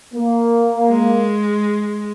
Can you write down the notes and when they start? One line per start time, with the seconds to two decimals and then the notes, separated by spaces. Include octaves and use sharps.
0.14 A#3
0.88 G#3